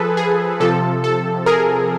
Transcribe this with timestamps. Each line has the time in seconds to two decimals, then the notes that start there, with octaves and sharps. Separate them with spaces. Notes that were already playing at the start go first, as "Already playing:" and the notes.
Already playing: F3 G#4 A4 B4
0.17 G#4
0.60 C3 F3 A4
1.04 A4
1.46 G#4 A#4